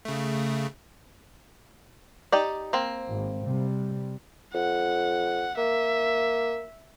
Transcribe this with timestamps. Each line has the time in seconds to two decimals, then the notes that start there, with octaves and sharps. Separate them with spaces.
0.05 C#3 A3
2.32 D#4 G4 D5
2.73 A#3 C4
3.08 G#1
3.44 C3 G3
4.54 F2 F#5
5.57 A#3 E5